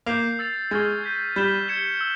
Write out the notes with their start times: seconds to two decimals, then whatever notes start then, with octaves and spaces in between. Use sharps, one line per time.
0.06 A#3 G6 C7 F7
0.39 E6 A6 C7 F7
0.71 G#3 C#6 F6 G#6 C7
1.04 G6 B6 D#7
1.36 G3 G6 B6 E7 G7
1.68 G#6 C#7 E7 G7
2.01 E6